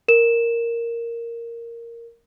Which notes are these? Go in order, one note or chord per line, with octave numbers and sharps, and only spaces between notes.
A#4 E7